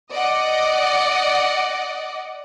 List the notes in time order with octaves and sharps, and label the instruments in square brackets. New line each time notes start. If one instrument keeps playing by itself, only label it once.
[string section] D5 D#5 F#5